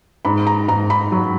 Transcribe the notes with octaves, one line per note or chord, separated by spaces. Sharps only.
G#2 B5
A#5
G#2 A#5
B5
F#3